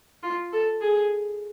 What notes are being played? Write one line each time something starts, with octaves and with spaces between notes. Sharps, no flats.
F4
A4
G#4